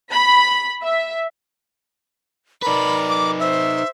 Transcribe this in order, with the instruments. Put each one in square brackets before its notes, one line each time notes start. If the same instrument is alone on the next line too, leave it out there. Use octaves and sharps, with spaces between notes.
[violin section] B5
E5
[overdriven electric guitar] D#4 B4 [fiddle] A#4 D5 [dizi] B5
[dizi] D6
[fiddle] C5 [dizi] E5